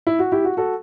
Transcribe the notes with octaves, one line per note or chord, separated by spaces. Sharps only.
E4
F#4
E4 G4
F#4
F#4 A4